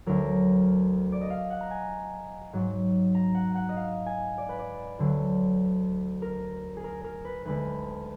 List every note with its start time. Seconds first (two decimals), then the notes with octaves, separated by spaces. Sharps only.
0.06 D2 D3 F#3 A#4
1.12 D5
1.21 D#5
1.30 F5
1.50 F#5
1.61 A#5
1.71 G#5
2.53 G#2 F#3
3.15 A#5
3.35 F#5
3.55 F#5
3.69 D#5
3.76 F5
4.06 G#5
4.38 D5
4.49 B4
4.59 D5
4.99 D2 D3 F#3
6.22 A#4
6.77 G#4
6.84 A#4
7.04 A#4
7.25 B4
7.45 D2 D3 G#3 B4